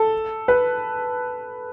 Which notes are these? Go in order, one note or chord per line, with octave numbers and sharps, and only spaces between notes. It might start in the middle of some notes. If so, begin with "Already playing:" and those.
Already playing: A4
B4